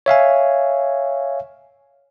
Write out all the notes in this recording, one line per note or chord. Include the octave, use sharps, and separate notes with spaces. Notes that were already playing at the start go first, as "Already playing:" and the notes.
C#5 E5 F5 G#5